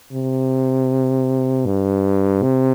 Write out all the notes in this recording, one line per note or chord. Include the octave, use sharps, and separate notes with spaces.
C3
G2
C3